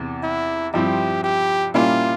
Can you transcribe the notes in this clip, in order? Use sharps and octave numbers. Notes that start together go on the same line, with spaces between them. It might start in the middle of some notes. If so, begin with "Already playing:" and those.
Already playing: E2 C3 E3
E4
G2 F3 C4 E4 G4
G4
A#2 G3 A#3 C#4 E4 F4